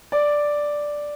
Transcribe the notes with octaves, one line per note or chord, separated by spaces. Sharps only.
D5